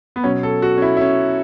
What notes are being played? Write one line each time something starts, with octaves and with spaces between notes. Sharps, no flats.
B3
B2 F#3 C#4
A4
F#4
C#4
E4
E4
C#4